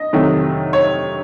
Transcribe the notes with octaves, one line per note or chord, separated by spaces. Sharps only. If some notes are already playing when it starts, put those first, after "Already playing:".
Already playing: D#5
F2 C3 D#3 F#3 A3
C#5